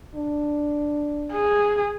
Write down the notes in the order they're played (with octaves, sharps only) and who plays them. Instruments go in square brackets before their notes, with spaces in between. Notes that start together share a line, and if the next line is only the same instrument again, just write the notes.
[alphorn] D4
[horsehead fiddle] G#4